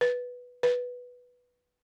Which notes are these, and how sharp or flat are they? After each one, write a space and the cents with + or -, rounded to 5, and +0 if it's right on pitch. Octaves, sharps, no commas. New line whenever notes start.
B4 -5
B4 -5